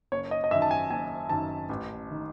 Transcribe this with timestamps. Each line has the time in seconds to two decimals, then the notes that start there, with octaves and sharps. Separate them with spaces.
0.12 F#1 C#5
0.31 D#5
0.44 D#5
0.51 F#2 D#3 E5
0.62 A5
0.71 G#5
0.90 F#1 G#5
1.29 F#2 D#3 A5
1.69 A1
2.11 D#3